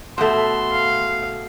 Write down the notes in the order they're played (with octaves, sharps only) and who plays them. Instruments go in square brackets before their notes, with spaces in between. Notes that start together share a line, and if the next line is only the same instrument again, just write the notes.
[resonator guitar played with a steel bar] B2 A3 [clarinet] C6
[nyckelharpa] F5